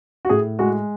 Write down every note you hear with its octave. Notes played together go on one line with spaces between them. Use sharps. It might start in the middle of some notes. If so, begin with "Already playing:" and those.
F#4
A2 G#4
G#3 F#4